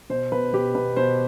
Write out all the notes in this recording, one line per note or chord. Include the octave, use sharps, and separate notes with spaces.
B2 C5
B2 B4
B2 G4
B2 B4
B2 C5